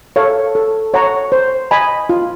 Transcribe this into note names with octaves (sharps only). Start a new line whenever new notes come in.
A4 C#5 F5
A4
C#5 F#5 A#5 C#6
C5
D#5 G#5 B5
F4